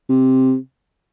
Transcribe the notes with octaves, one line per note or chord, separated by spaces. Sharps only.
C3